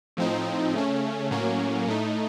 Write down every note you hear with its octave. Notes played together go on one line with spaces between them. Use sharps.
A2 F3 C4 D#4
C#3 A3 C#4
A2 F#3 A#3 C#4
A2 A3 D#4